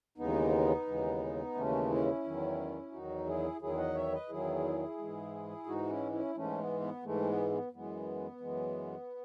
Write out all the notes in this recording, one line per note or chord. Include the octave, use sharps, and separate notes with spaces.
D#2 C#3 E3 G#3 B3 D#4
D#2 C#3 E3 G#3
D#2 C#3 E3 G#3 A3 C#4
C#4 E4
E2 D#3 F#3
E2 D#3 F#3 D#4 F#4
E4 G#4
E2 D#3 F#3 E4 G#4
D#5 F#5
C#5 E5
B4 D#5
E2 D#3 F#3 E4 G#4
G#2 E3 G#3
G#2 E3 G#3 D#4 F#4
C#4 E4
C#4 E4
G#2 E3 G#3 A3 C#4
B3
B3
G#2 E3 G#3 A3
B3
B3
F#2 E3 G#3 B3
F#2 E3 G#3